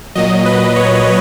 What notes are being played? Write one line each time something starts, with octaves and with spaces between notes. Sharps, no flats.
A#2 F#3 D#5
B4
C#5